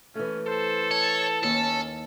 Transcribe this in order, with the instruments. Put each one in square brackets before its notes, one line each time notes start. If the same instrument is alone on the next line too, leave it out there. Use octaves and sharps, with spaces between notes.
[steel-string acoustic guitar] E3 A3 [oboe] C#4
[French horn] A4 [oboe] C5
[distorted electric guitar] C#5 [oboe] A5
[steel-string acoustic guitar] D#2 [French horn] C#4 [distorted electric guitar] A4